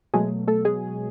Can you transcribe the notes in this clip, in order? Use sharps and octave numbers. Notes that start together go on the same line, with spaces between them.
B2 F#3 G#3 A3 G#4
A3 A4
G#3 G#4